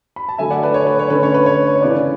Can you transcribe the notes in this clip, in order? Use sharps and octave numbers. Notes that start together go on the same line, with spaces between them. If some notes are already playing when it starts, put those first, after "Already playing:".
B5
A5
D3 F#3 A3 E5 G#5
D5 F#5
B4 D5
C#5
B4
C#5
D3 A3 C#4 B4
C#5
B4
C#5
B4
C#5
C#3 E3 B3 D4 B4 D5